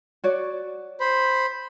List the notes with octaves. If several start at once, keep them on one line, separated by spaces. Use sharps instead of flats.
F#4 C#5 D5
C5 B5